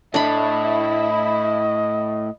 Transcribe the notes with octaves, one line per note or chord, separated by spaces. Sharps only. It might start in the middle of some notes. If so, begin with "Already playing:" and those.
A2 A3 D4 E4 D#5 B5